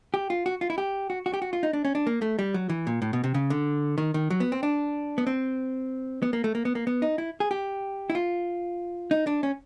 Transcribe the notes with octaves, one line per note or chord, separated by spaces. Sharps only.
G4
F4
F#4
F4
E4
G4
F#4
F#4
G4
F#4
F4
D#4
D4
C#4
D4
A#3
A3
G3
F#3
E3
A#2
A2
B2
C3
C#3
D3
D#3
D#3
F#3
B3
C4
D4
B3
C4
B3
A#3
A3
A#3
B3
A#3
B3
D#4
E4
G#4
G4
E4
F4
D#4
D4
C#4